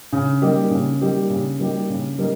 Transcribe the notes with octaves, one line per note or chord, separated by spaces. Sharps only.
C#3
G3 A#3 D#4 G4
C#3
G3 A#3 D#4 G4
C#3
G3 A#3 D#4 G4
C#3
G3 A#3 D#4